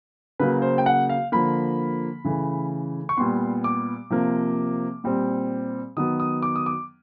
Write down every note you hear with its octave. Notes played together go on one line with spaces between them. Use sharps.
C#3 F#3 A#3 B4
C5
G5
F#5
F5
D3 F3 A#3 B5
C#3 E3 A3
C#6
A#2 G3 B3 C6
D6
C3 F3 A#3
A#2 G3 C4
D#3 F#3 B3 D#6
D#6
D6
D#6
D6